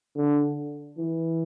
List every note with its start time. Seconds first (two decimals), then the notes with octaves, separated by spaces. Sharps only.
0.16 D3
0.98 E3